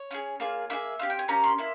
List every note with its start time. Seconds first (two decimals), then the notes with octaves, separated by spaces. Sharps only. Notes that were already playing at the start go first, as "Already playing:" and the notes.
Already playing: C#5
0.11 C#4 F4 G#4
0.40 A#3 F4 G#4
0.70 A#3 E4 G#4 E5
0.99 C4 E4 G4 F5
1.10 G5
1.19 G#5
1.28 A#3 C#4 G4 A#5
1.44 C6
1.58 A#3 E4